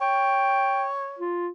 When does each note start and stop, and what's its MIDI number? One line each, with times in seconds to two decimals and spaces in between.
0.01 1.23 73
0.01 0.86 79
1.19 1.50 65